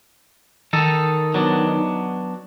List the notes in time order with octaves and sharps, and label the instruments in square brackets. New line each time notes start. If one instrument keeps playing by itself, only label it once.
[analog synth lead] D#3 [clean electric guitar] D#4 A4
[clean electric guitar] F#3 B3 D4